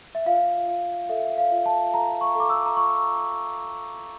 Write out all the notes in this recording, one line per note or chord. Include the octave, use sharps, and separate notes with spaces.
E5
F4 F5
F4
A4 E5
F5
F4
A5
A4 A#5
C#6
A4 D6
E6
A#5
F4 C#6